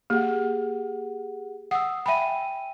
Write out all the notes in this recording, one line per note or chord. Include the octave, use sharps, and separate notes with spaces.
A#3 G4 G#4 F#5
F#5 D#6 E6
E5 G5 G#5 B5 D#7